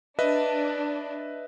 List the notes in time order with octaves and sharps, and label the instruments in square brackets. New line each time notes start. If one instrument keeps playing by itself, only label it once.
[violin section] D4 [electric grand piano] B4 D#5 E5